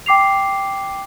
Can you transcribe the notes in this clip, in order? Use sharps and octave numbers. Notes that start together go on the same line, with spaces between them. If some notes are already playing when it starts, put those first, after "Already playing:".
G5 D6 C7 F7